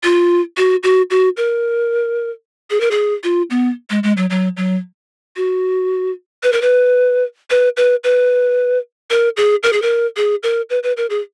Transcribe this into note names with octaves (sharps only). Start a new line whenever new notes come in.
F4
F#4
F#4
F#4
A#4
G#4
A#4
G#4
F4
B3
G#3
G#3
F#3
F#3
F#3
F#4
B4
A#4
B4
B4
B4
B4
A#4
G#4
A#4
G#4
A#4
G#4
A#4
B4
B4
A#4
G#4